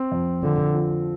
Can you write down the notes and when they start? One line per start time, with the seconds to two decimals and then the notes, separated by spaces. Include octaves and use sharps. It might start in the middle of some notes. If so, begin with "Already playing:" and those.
Already playing: C4
0.12 F2
0.43 D3 F3
0.75 F3